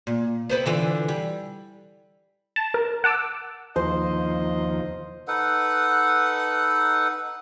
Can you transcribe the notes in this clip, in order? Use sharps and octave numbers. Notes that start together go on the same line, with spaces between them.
A#2
B3 C4 B4
D3 E3 F4
G3
A5
A#4
F#5 A5 D6 E6
D#2 F3 C5 D#5
D#4 A4 B4 F#5